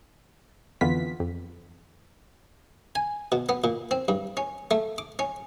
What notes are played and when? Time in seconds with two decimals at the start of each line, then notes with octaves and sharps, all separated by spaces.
0.81 F2 D3 E3 B3 F4 B6
1.20 F2
2.95 G#5
3.32 B2
3.49 B3
3.64 A#2
3.91 C4
4.08 G2
4.37 C#4
4.71 A3
4.98 D6
5.19 C#4